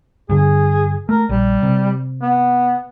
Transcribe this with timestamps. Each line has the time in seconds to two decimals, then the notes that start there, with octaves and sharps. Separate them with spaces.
0.29 G2 D3 G#4
1.09 A3 A#4
1.29 A#1 G3
1.63 C3
2.22 B3